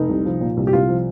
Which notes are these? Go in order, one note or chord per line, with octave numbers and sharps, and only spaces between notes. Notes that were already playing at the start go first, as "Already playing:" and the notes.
Already playing: F1 D#4
C2
F3
A#2
C2
G4
C2 F4
F3